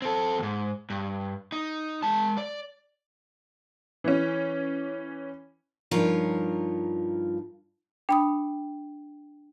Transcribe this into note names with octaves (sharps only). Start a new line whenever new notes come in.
C4 A4
D#2 G#2
G2
D#4
G#3 A5
D5
E3 C#4
G2 F3 D#4 F4 A#4 C#5
D4 G5 B5 D#6